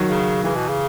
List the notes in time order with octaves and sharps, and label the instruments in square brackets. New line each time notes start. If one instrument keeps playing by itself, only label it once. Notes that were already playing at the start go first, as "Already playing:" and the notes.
Already playing: [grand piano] D#3 F#3
[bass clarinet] C#3
[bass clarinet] C#3 [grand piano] E3
[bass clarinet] B2
C#3